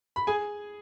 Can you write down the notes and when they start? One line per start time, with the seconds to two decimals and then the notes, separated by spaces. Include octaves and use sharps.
0.16 B5
0.27 G#4 G#5